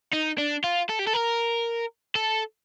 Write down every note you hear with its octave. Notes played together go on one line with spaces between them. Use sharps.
D#4
D4
F4
A4
G4
A4
A#4
A4